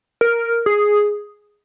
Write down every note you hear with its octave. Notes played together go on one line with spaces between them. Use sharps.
A#4
G#4